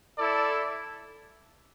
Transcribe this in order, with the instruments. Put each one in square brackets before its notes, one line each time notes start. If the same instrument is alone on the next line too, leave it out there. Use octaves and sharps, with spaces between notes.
[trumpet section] E4 A4 D5